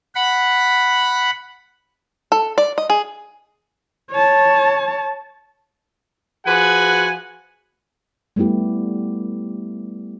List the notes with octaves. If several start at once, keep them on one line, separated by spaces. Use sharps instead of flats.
F#5 B5
A4
D5
D#5
G#4
C#5 A5
F3 F#4 G#4 B4 F#5 G#5
G3 A3 B3 E4 G4